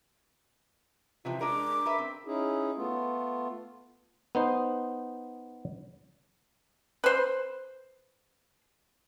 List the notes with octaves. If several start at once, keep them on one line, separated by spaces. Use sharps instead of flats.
C3 E3 F3 F4
G#3 D4 A#4 D6
A#4 B4 E5
C4
C#4 D#4 E4 G#4
A3 B3 F4
B3 D#4 C5
B4 C5